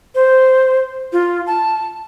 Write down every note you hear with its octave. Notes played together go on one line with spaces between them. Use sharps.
C5
F4
A5